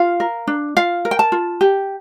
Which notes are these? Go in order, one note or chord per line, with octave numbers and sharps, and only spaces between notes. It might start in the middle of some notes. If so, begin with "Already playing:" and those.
Already playing: F4 F5
A#4
D4
F4 F5
A#4
G5
A5
F4
G4